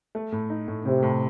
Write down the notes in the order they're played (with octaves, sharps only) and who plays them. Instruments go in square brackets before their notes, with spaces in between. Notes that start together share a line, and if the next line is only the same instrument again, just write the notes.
[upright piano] A3
A2
D#4
A2
[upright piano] A2 [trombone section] C3
[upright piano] A2